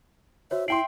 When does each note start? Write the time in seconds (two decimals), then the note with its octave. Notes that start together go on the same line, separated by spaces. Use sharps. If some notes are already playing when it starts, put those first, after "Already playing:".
0.51 F#4 C5 C#5 E5
0.68 E4 E5 G5 C6 C7 D7 F#7